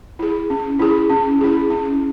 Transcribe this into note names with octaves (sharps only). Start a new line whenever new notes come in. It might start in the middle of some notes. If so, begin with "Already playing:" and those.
E4 G#4
C#4
E4 G#4
C#4
E4 G#4
C#4